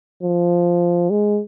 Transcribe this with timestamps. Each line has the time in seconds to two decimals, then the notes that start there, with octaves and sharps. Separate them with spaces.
0.23 F3
1.10 G#3